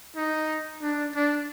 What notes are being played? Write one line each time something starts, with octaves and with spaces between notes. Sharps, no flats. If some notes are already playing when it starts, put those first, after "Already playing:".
D#4
D4
D4